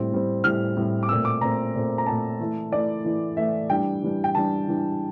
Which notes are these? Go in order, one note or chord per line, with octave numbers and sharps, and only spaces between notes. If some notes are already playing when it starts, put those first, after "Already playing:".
Already playing: A2 G3 C4
A2 G3 C4
A2 G3 C4 F6
A2 G3 C4
D6
A#2 A3 C4 E6
D6
A#2 A3 C4 A#5
A#2 A3 C4
A#5
A#2 A3 C4 A5
E3 A3 E4
E3 A3 E4 D5
E3 A3 E4
E3 A3 E4 E5
E3 G3 D4 G5
E3 G3 D4
G5
E3 G3 D4 A5
E3 G3 D4